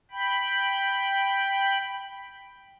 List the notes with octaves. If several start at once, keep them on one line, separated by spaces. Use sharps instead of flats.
G5 B5